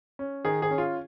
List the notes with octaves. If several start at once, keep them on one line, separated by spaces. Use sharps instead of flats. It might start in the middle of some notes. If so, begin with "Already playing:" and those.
C#4
D#3 G#4
G#4
C#4
F4